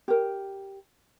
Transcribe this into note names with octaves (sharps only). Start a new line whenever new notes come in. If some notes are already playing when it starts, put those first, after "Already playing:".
G4 A#4